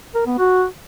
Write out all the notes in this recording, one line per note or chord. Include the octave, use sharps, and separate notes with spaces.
A#4
B3
F#4